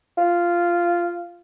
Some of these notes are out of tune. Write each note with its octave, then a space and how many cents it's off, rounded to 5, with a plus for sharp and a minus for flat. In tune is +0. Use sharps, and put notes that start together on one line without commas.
F4 -10